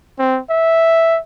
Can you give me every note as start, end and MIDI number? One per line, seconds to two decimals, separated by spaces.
0.19 0.40 60
0.50 1.19 76